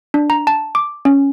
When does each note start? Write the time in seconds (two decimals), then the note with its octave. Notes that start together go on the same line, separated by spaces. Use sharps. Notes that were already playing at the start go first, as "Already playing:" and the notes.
0.14 D4
0.30 A#5
0.47 A5
0.75 D6
1.05 C#4